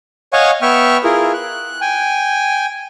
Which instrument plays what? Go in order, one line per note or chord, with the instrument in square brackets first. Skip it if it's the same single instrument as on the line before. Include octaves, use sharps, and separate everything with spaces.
[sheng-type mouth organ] C#5 D#5 F5 F#5 G#5 C#6
B3 E5 G5 C#6 F6
E4 F4 G#4 A#4
F#6
G5 G#5